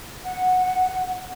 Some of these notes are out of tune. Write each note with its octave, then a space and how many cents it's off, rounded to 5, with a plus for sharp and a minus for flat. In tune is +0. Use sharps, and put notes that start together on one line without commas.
F#5 -10